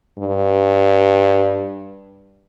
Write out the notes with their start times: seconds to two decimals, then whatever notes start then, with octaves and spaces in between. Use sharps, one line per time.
0.19 G2